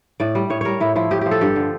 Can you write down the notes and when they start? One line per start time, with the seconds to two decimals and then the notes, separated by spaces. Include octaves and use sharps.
0.20 A2 D5
0.35 G3
0.50 A2 C#5
0.61 G3 A#4 C#5
0.80 A2 E4
0.95 F3 E4
1.11 A2 G4
1.21 F3 G4
1.31 A4
1.41 G2 G4
1.56 D3 F3